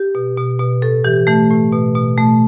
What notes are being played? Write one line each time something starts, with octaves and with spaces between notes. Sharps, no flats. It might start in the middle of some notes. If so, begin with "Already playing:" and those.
Already playing: G4
B2
B2
B2
A2 A4
E3 G4
E3 A3
A2
B2
B2
B2 A3